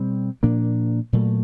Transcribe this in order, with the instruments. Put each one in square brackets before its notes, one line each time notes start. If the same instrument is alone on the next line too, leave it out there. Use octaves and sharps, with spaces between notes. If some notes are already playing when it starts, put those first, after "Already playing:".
Already playing: [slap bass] B2 G3 C4
A#2 F3 A#3 D4
A#2 F#3 A3